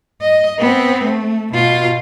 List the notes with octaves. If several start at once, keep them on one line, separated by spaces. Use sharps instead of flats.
D#5
B3 C4
A3
B2 F4